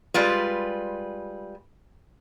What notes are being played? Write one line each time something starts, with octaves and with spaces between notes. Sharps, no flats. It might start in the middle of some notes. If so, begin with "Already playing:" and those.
G3 G#3 F4 B4